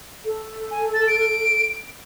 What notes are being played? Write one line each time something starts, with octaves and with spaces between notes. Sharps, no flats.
A4
G#5
A6
D7